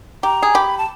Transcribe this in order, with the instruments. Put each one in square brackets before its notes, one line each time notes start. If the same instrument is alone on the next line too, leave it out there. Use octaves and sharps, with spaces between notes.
[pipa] G4 [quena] A#5
[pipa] G#4
[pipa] G4 [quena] B5
[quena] A5